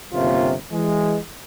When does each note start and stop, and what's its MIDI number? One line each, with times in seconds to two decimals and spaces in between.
0.14 0.53 31
0.14 0.53 39
0.14 0.53 48
0.14 0.53 58
0.14 0.53 61
0.14 0.53 65
0.72 1.18 52
0.72 1.18 56